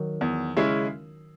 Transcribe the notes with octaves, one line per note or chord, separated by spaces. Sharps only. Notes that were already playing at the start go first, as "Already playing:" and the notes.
Already playing: D#3 F#3
E2
C#3 G#3 C#4 E4